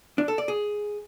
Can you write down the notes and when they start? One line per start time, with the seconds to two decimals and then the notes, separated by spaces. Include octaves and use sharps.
0.18 D4
0.28 A4
0.38 D5
0.48 G#4